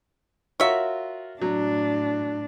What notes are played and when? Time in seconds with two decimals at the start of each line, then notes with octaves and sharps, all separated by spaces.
0.60 F4 F#4 A#4 C#5 E5
1.42 A2 F#3 D4